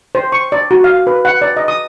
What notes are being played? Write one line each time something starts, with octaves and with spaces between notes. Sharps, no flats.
C5
C#6
D5
F#4
F5
B4
F#5
D5
D#5
D#6